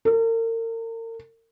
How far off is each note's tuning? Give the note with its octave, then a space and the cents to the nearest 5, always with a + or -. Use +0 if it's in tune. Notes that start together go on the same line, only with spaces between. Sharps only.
A#4 -40